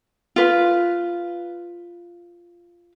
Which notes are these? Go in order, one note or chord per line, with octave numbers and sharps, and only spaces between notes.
F4 B4